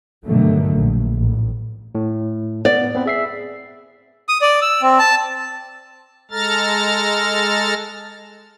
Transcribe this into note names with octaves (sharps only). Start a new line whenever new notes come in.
G2 B2 D3 D#3 F#3 A3
A#1
A1
A2
B3 D5
B3 C4 B4
G#4 E5 C7
D#6
D5
E6
C4
A5
G#3 A4 A#5 F6 A6